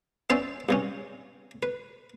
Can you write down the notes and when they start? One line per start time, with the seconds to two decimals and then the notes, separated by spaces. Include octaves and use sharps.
0.30 B3 C#4 D4 C5 D5 E5
0.69 G2 C3 C#4
1.63 B4